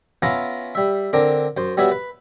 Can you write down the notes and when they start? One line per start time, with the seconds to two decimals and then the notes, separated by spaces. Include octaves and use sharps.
0.23 B3 C#4 E4 F4 F5 A#5
0.75 G3 E5
1.13 D3 C4 D4 A#4
1.57 F#2 C5
1.77 G3 B3 F#4 B4 C#5 E5
1.92 B4